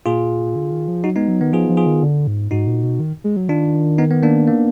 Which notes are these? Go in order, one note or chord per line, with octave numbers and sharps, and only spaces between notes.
A#2 F4 G#4
D3
D#3
F3
F#3 D#4 F#4
G#3 B3 D#4
F#3
D#3 B3
F3 F4 G#4
F3
F4 G#4
D#3
D3
G#2
G#2 D#4 F#4
A#2
B2
D#3
G#3
F#3
D#3 D4 F4
B3 D#4
B3
A#3 D4
A#3